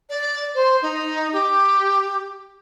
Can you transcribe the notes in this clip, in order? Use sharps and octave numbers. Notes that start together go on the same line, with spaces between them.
D5
C5
D#4
G4